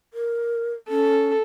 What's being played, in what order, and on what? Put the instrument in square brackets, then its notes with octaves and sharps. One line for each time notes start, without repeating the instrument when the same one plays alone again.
[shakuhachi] A#4
[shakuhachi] C#4 [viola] A4